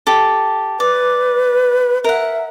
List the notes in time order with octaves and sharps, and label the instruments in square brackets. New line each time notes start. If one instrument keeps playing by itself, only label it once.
[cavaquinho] G4 A4
[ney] B4 [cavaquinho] D5
[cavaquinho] A#4 F#5 [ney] E5